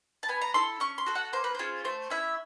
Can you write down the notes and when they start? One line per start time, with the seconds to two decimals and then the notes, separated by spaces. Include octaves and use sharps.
0.23 A5
0.28 B3 G#5
0.41 A#5
0.54 E4 A4 C6
0.80 C#4 C#6
0.98 C6
1.06 F#4 A4
1.15 F#5
1.33 A#3 C5
1.44 B4
1.55 C#4 F4 G#4 C5
1.84 A3 C5
2.10 C#4 E4 E5